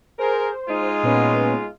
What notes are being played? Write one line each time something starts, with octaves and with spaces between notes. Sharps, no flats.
G#4 A#4 C5
G#3 D#4 F4
A#2 B3 C#4